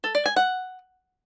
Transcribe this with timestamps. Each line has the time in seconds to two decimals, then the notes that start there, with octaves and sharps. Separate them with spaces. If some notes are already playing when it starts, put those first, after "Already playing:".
0.04 A4
0.15 D5
0.26 G#5
0.36 F#5